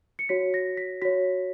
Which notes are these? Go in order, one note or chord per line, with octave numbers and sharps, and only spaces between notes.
C#7
F#4 C#5 B6
A#6
B6
F#4 C#5 B6